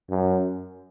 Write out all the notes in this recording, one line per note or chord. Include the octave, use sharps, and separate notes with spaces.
F#2